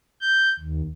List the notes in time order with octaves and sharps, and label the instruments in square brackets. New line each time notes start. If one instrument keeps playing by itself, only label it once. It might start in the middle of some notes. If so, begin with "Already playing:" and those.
[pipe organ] G6
D#2